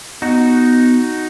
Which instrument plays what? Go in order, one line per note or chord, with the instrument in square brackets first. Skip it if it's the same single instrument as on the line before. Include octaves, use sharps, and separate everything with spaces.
[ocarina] B3 [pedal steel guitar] D#4 F#4